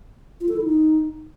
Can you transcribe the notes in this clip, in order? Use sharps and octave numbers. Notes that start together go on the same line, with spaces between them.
F4
A4
E4
D#4